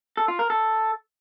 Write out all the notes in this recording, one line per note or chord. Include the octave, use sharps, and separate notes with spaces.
A4
F4
A#4
A4